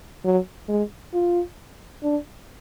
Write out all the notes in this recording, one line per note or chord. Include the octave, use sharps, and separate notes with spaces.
F#3
G#3
F4
D4